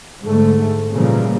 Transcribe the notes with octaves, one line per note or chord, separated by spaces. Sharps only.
G#2 D3 A3
A#2 C#3 E3 F3 G3 A#3